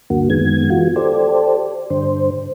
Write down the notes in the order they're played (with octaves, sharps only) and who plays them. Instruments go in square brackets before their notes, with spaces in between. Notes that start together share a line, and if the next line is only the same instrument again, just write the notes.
[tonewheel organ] D2 G2 D3 A#3 F#4
F#2 D#3 G#3 B3 G#6
E3 F4 F#4
G4 A4 C5 D5
G2 D3 C5